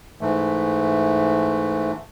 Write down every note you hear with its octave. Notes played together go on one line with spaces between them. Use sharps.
G#2 E3 A3